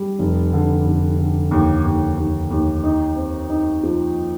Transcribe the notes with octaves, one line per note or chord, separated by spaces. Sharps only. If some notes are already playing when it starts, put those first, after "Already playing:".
Already playing: G3
F1
D3
F1
D3
D#2
D#2
D#2
D#2
D#4
C4
D#4
F3